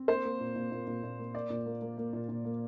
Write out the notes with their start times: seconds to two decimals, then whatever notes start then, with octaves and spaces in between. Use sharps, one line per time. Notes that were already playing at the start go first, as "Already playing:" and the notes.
Already playing: C4
0.08 A#3 C5
0.25 A#3
0.40 A#2
0.55 A#2
0.71 A#2
0.87 A#2
1.03 A#2
1.19 A#3
1.35 A#3 D5
1.50 A#2
1.66 A#3
1.82 A#3
1.97 A#3
2.13 A#2
2.29 A#2
2.44 A#3